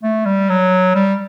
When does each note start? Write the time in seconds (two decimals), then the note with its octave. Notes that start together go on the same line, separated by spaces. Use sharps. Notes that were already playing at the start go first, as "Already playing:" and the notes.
0.03 A3
0.26 G3
0.50 F#3
0.95 G3